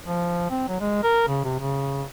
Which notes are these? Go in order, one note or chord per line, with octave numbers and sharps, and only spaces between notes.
F3
C4
F#3
G#3
A#4
C#3
C3
C#3